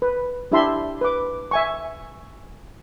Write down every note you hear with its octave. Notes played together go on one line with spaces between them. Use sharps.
B4
D4 E4 G4 E5 A5 C6
B4 D6
E5 G#5 C#6